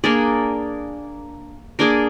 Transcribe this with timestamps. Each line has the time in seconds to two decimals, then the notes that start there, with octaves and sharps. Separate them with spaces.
0.04 A#3 D4 G#4 D5
1.79 A#3 D4 G#4 D5